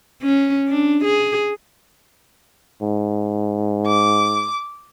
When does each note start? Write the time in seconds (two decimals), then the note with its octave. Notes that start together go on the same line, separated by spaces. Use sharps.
0.22 C#4
0.68 D4
1.05 G#4
2.82 G#2
3.86 D6